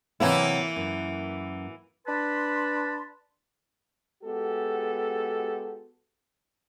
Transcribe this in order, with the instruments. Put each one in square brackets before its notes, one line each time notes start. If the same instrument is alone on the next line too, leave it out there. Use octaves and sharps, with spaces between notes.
[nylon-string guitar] C3 F#3 B3 [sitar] E3 A#3 E4
[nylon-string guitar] F#2
[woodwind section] D4 B4 A5 B5 C6
[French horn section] G#3 B3 F#4 G4 A4